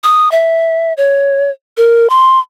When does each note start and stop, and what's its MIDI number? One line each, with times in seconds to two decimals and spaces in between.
0.03 0.31 87
0.32 0.93 76
0.97 1.50 73
1.77 2.09 70
2.10 2.39 84